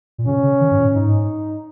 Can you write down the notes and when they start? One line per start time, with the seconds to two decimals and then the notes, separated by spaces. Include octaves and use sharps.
0.18 A#2
0.26 C#3 C#4
0.43 C#3
0.61 D#3
0.71 G#2
0.78 A#2
0.95 G#2 D#4